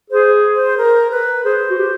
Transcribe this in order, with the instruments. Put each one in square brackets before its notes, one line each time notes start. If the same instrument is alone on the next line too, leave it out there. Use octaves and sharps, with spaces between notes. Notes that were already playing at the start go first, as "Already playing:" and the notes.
[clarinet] G#4 [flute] C5
[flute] C5
A#4
B4
[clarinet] G#4 [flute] C5
[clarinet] F#4
G4